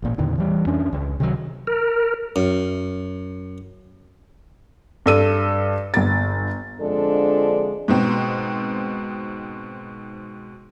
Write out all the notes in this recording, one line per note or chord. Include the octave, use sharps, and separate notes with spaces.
A1 A#2
E2 A#2 D3 D#3
E3 G3
F2 C#4 D4
C#2
C3 D#3 F#3
A#4
F#2
G2 A4 D#7
G1 A6
F2 D3 F3 G#3 D4 A4
G#2 B2 C4